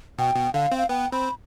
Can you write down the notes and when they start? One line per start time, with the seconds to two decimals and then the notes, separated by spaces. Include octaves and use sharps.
0.19 B2 G5
0.36 B2
0.54 D3 F5
0.72 C4
0.78 F5
0.89 B3 G5
1.12 C4 B5